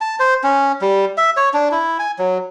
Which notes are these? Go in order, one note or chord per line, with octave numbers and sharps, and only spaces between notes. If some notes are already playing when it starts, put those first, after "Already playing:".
A5
C5
C#4
G3
E5
C#5
D4
E4
G#5
F#3